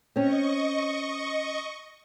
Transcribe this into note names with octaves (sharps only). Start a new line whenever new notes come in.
C4 C#4 D#5 C#6